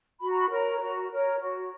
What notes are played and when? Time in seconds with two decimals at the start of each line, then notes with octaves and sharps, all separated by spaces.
0.20 F#4 B5
0.30 A#5
0.39 B5
0.50 A#4 C#5 A#5
0.80 F#4
1.10 A#4 C#5
1.39 F#4